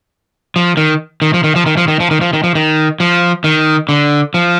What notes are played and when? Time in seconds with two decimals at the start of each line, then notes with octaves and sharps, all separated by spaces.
0.56 F3
0.77 D#3
1.22 D#3
1.34 F3
1.44 D#3
1.56 F3
1.66 D#3
1.77 F3
1.88 D#3
2.00 F3
2.11 D#3
2.21 F3
2.33 D#3
2.44 F3
2.55 D#3
3.00 F3
3.44 D#3
3.89 D3
4.34 F3